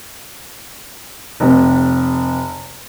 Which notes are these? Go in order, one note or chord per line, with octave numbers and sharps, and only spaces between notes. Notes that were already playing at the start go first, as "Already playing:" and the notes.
F1 C3